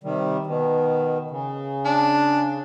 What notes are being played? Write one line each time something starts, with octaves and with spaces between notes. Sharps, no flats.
C3 D#3 G3
B2 D#3
C#3
D4